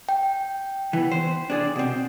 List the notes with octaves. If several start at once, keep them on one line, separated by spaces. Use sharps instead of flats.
G5
E3 B3
C5
D4 G#4 D5
B2 C4